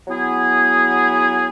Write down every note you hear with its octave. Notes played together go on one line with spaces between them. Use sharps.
F#3 B3 E4 G#4